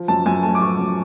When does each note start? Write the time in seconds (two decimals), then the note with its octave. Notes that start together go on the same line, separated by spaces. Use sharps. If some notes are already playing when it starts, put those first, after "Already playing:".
Already playing: F3
0.08 F#2 A5
0.26 F#2 G#5
0.43 A3 A5
0.55 D6
0.61 F3 C#6
0.79 F#2